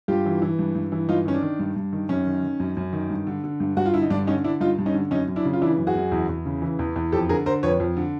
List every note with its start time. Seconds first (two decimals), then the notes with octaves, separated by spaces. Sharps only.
0.08 G2 F4 G4
0.26 E3
0.42 E3
0.59 G2
0.75 G2
0.92 E3
1.09 G2 D#4 F4
1.26 D#3 C#4
1.34 D4
1.42 D#3
1.59 G2
1.76 G2
1.93 D#3
2.09 F#2 C#4
2.26 D#3
2.43 D#3
2.60 F#2
2.77 F#2
2.93 D#3
3.10 G2
3.27 D3
3.44 D3
3.60 G2
3.77 G2 F#4
3.86 F4
3.94 D3 E4
4.02 D#4
4.10 G2 D4
4.27 D3 C#4 D#4
4.44 D3 D4 E4
4.60 G2 D#4 F4
4.78 G2
4.86 C#4 D#4
4.94 D3
5.11 F#2 C#4 D#4
5.28 F#2
5.36 D4 E4
5.45 C#3
5.53 F4
5.62 E3 D4 E4
5.78 F#2
5.87 F#4 G#4
5.95 F#2
6.12 E2
6.29 E2
6.46 C#3
6.62 E3
6.79 E2
6.96 E2
7.12 F2 G4 A4
7.29 D3 G#4 A#4
7.46 D3 A#4 C5
7.63 F2 B4 C#5
7.80 F2
7.97 D3